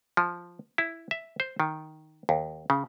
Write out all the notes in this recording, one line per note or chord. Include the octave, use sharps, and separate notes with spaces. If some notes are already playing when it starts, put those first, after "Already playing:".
F3
E4
E5
C5
D#3
D#2
C#3